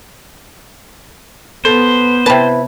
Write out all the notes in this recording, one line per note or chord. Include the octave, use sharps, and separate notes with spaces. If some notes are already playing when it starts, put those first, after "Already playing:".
B3 A4 C5
C3 E4 B4 A5